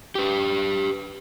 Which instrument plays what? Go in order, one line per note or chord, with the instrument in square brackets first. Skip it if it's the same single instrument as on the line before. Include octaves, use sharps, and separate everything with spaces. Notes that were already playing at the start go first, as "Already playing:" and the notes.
[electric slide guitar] G4 B4